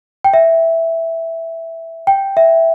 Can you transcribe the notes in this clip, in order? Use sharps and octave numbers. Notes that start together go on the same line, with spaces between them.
G5
E5
G5
E5